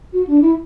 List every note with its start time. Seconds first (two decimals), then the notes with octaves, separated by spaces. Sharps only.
0.13 F#4
0.27 D4
0.41 E4